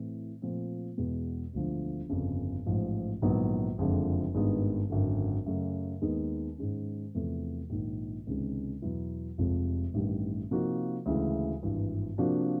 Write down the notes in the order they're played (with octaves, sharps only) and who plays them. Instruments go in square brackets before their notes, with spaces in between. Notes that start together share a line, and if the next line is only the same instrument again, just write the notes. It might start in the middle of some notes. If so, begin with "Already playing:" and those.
Already playing: [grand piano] A2 E3 A3 C4 E4
A#2 F3 A3 C4
E2 B2 G#3
E1 D2 D3 F3
G1 F2 C#3
A1 G#2 F3
A#1 G#2 D#3 F#3 B3
F#1 F2 D3 F3 G#3
G#1 G2 D#3 G#3 B3
G#1 F#2 D3
F#2 C#3 F#3 A3
D#2 D#3 G#3 B3 D#4
G#2 D#3 G#3 C#4
E2 C3 F3 A3
A#1 G#2 D#3
C#2 C3 D#3 G#3 C#4
E2 B2 F#3 B3 E4
F1 F2 C3 F3 G#3
A1 G2 D#3 G3
C3 F3 A#3 D#4 F#4
D2 C#3 E3 G#3
G#1 G2 E3
C3 F3 A#3 D4 F#4